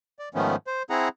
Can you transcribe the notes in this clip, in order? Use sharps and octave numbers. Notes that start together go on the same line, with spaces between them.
D5
G#2 D#3 F3 A3 B3 C#4
C5
C4 E4 G#4 F#5 A#5